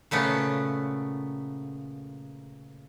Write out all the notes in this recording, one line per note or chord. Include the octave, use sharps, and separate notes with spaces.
A#2 C#3 A3 B3